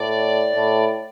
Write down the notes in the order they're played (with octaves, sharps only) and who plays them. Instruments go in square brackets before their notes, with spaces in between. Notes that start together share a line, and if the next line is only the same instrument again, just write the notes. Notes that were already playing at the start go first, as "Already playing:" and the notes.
Already playing: [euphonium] A2 [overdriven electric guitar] D5
[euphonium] A2